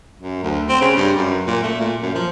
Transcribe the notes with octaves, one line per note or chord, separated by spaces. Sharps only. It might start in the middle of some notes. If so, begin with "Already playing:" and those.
F#2
D2
C4
C#3
G2
F#2
A#2
A3
A#2
F#2
F3